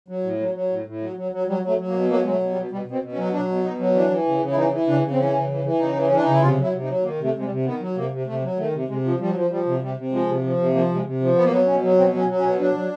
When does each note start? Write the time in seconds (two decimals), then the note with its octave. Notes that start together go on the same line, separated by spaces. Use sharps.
0.08 F#3
0.24 A2
0.40 F#3
0.54 F#3
0.70 A2
0.86 A2
1.01 F#3
1.16 F#3
1.32 F#3
1.47 F#3 G3
1.62 F#3
1.68 A3
1.78 F#3
1.88 A#3
1.93 B2
2.09 F#3 A#3
2.23 F#3 G#3
2.30 A3
2.40 B2
2.50 G3
2.55 B2
2.71 B2 G3
2.86 B2
2.91 C4
3.02 B2
3.12 C#4
3.17 F#3
3.32 F#3 D4
3.48 B2
3.63 B2 D#4
3.79 F#3
3.94 E3 D4
4.10 E3
4.26 C#3
4.41 C#3
4.51 E4
4.56 E3 D#4
4.72 E3
4.87 C#3 D4
5.03 C#3
5.11 C4
5.18 E3 C#4
5.34 C#3
5.49 E3
5.64 E3
5.79 C#3 D#4
5.95 E3
6.07 C#4
6.11 E3 D4
6.24 C#3 D#4
6.33 E4
6.41 C3 F4
6.57 F#3 E4
6.73 C3
6.83 D#4
6.88 F#3
7.03 D#3 A#3
7.19 C3
7.24 A3
7.34 C3 G#3
7.44 G3
7.49 C3
7.65 D#3 B3
7.80 F#3
7.96 C3 A#3
8.11 C3
8.27 C3 A3
8.42 F#3
8.57 D#3 A3
8.73 C3
8.88 C3 G#3
9.04 F3
9.19 F3 G3
9.29 F#3
9.35 F3
9.50 F3 G3
9.66 C3
9.81 C3 G3
9.97 C3
10.12 F3 G#3
10.27 C3
10.43 F3
10.58 C3
10.73 F3 A#3
10.89 C3
10.94 G#3
11.05 C3
11.20 F3
11.35 B2 B3
11.44 A#3
11.51 F#3 B3
11.66 B2 C#4
11.82 F#3
11.97 B2 C4
12.13 F#3 C#4
12.28 F#3
12.38 C#4
12.43 B2
12.59 F#3 D4
12.74 F#3